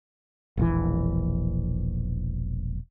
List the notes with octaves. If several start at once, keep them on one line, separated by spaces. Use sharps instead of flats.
E1 A#1 E3